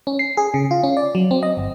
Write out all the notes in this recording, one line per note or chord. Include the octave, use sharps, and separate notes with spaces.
C#4
C7
G#4
C#3
F4
C#4
D5
F#3
C4
D#5
G1